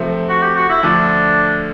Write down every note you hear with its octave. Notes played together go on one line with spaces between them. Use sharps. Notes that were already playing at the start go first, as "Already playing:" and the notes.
Already playing: C3 F3 A3 C4
F#4
G4
F#4
E4
D2 D3 F3 D4